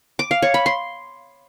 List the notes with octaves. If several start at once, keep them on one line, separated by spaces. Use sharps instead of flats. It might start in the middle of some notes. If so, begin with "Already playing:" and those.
D6
F5
C#5
B5
C6